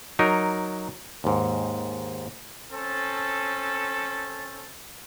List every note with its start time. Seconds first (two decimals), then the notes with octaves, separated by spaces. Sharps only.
0.19 F#3 D#4 A#4
1.24 D#2 G#2
2.72 C4 C#4 A4